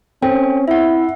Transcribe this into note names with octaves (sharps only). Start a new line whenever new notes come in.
C4 C#4 A4 G5
E4 E5 F#5